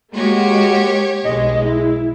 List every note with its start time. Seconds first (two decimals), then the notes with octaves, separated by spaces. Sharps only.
0.15 G#3 A#3 F#4 G4 C#5
1.25 B1 G#3 D#5
1.65 E4